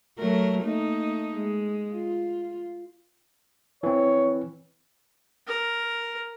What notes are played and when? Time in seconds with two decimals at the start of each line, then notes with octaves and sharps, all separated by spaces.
0.18 F#3 A3 A#4
0.62 A3 A#3 D#4
1.36 G#3
1.93 F4
3.83 E3 C4 C#5
5.47 A#4